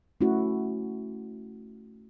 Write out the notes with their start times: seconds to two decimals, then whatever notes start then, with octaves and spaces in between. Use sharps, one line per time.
0.21 A3 C#4 E4 F#4